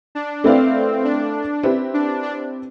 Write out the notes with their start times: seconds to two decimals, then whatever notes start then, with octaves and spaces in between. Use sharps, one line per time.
0.15 D4
0.44 A3 C4 E4 B4 D5 F5
1.04 D4
1.63 C4 E4 G4 B4
1.94 D4
2.23 D4